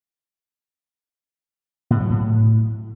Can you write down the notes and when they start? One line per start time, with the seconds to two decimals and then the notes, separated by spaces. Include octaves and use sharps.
1.90 A2
2.00 F#3
2.10 A2